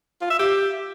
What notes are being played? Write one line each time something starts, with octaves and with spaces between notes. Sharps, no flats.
F4
E5
G4